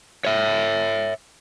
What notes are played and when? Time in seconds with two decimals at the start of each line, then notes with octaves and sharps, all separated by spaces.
0.25 C#5 E5